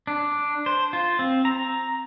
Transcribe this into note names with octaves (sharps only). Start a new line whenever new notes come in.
D4
C5
F4
C4
A#5